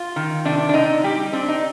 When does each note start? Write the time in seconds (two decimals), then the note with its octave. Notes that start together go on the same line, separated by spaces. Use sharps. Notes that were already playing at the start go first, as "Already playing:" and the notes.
Already playing: F4
0.16 D#3
0.45 C3 D4
0.69 D4
0.74 C3 D#4
1.04 G3 G4
1.33 C4 D4
1.49 D#4